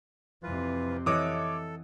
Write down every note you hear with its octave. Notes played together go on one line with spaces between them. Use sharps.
F2 C3 E3 F4 B4
E3 A4 C#5 D#5 F#5 D6 D#6